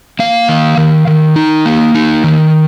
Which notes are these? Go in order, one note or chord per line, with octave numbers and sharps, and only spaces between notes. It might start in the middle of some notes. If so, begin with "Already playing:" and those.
A#3 F5
D#3
D#3
D#3
D#4
A#3
D#4
D#3